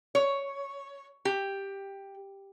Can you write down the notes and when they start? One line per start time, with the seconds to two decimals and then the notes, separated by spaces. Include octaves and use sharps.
0.15 C#5
1.25 G4